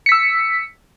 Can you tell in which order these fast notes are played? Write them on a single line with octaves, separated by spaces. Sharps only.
C#7 B6 E6